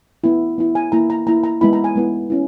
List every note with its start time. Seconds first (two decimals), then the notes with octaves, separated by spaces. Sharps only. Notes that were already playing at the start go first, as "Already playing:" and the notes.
0.24 B3 E4
0.58 B3 E4
0.75 G#5
0.92 A#3 E4 A#5
1.10 A#5
1.27 A#3 E4 A#5
1.44 A#5
1.61 G#3 B3 E4 B5
1.73 A#5
1.84 G#5
1.95 G#3 B3 E4
2.30 C#4 E4